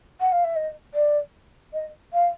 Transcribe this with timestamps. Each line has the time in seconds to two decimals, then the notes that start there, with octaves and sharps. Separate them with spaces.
0.20 F#5
0.32 F5
0.44 E5
0.55 D#5
0.94 D5
1.73 D#5
2.13 F5